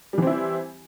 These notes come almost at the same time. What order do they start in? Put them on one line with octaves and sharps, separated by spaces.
G3 E3 C4 E4